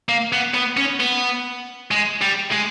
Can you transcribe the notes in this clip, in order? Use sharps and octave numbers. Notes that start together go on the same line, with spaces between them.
A#3
B3
B3
C#4
B3
G#3
G3
G#3